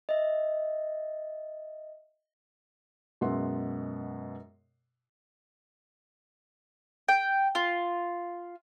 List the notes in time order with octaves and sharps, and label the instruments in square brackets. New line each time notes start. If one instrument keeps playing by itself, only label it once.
[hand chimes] D#5 E5
[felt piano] F#2 B2 G#3 E5 F#5 C6
[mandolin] G5
F4